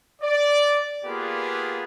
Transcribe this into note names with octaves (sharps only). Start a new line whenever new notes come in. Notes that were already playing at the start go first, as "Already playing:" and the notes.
D5
A#3 B3 F4 G4 G#4 B4